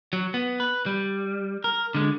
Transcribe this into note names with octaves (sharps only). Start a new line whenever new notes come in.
F#3
B3
B4
G3
A#4
D3 G#3